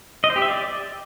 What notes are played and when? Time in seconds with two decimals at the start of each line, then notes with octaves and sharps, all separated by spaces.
0.24 D#5
0.30 C5
0.36 G4
0.42 E5
0.48 D5